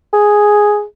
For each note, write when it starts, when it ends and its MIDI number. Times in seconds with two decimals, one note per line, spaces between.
0.13 0.84 68